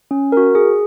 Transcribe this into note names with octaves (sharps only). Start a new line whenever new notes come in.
C#4
F#4 A#4
G#4